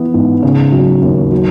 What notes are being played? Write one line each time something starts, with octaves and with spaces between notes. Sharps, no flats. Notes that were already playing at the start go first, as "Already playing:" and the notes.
Already playing: E3 B3
G#2
C#3
F#3
D#2
F#3